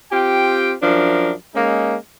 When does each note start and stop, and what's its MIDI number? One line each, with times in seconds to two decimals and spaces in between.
0.11 0.73 60
0.11 0.73 65
0.11 0.73 67
0.11 0.73 79
0.82 1.32 42
0.82 1.32 53
0.82 1.32 62
0.82 1.32 70
1.55 1.95 56
1.55 1.95 58
1.55 1.95 61
1.55 1.95 63